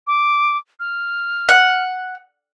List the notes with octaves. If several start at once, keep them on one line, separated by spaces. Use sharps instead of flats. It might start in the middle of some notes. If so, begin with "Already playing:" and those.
D6
F6
F#5